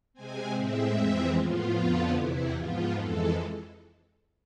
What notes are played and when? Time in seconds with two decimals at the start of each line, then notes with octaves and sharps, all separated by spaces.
0.13 C3 G#3 C4 G#5
0.54 A2 G#3 C4 E5
0.95 F2 E3 G#3 C4
1.35 A2 F3 B3 F4
1.75 F2 D3 F3 B3
2.15 E2 C3 E3 E4
2.55 G#2 F3 B3 F4
2.95 F2 E3 G#3 A4